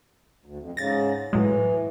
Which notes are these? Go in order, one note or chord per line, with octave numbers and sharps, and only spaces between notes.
D2
F2
G#2 C#3 A6 A#6
A2 E3 F#3 G#3